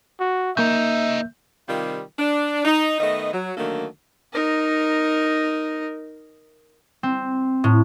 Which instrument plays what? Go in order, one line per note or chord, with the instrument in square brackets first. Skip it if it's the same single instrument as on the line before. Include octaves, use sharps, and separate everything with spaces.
[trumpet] F#4
[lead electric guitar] C#3 D#4 [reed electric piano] A#3 G6 [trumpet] E5
[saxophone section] C3 D#3 G3 F4
D4
D#4
D#3 A3 B3 D#5
F#3
D3 D#3 F#3 A3 A#3
[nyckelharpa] D#4 A#4
[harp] C4
A2